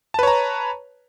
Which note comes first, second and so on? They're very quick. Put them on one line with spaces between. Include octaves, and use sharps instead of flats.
A5 B4 C#5 A#5